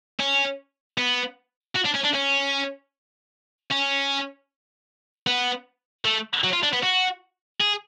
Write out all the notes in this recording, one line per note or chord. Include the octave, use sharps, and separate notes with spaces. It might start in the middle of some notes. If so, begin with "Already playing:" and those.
C#4
B3
F#4
D4
C#4
D4
C#4
C#4
B3
A3
F#3
F4
D4
B3
F#4
G#4